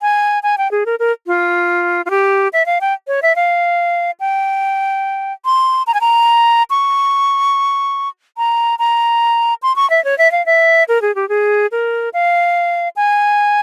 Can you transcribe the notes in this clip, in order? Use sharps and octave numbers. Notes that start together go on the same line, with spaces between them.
G#5
G#5
G5
G#4
A#4
A#4
F4
F4
G4
E5
F5
G5
C#5
E5
F5
G5
C6
A#5
G#5
A#5
C#6
A#5
A#5
C6
C#6
E5
C#5
E5
F5
E5
A#4
G#4
G4
G#4
A#4
F5
G#5